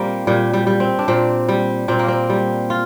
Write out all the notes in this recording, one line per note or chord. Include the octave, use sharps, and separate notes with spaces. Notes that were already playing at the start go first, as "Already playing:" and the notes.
Already playing: A#2 G3 A#3 C4
A#2 G3
G3
G3
C4
D4
A#2 C4
G3
A#2 C4
A#3
C4
G3
F4